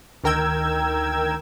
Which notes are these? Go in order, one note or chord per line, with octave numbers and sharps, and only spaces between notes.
D2 D#3 A#4 G5 E6 G#6